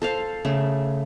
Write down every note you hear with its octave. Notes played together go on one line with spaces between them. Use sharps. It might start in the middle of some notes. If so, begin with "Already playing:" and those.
A4 C5 F5
C#3 A3